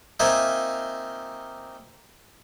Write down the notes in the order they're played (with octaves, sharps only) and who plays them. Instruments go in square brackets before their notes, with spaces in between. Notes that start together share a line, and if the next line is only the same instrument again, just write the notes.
[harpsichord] A#3 C4 D#4 F4 E5 G#5